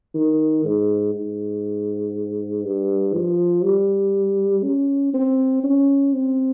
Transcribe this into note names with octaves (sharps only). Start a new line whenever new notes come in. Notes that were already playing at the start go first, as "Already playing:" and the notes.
D#3
G#2
G#2
G2
F3
G3
C#4
C4
C#4
C4